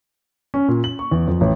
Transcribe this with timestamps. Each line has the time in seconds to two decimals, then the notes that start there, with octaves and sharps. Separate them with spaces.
0.54 C#4
0.68 A#2
0.84 F#7
0.99 C#6
1.11 E2
1.28 F2
1.41 A1